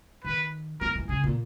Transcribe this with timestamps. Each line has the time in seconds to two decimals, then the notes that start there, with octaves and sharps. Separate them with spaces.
0.24 D#3 B4
0.81 E3 A#4
0.95 E3
1.09 C#3 G#4
1.24 A#2